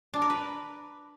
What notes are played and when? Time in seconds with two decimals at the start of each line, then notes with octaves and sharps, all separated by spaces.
0.14 D4
0.22 A#4
0.30 B4